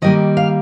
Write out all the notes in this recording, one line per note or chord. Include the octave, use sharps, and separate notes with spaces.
D#3 G3 A#3 D#5
F5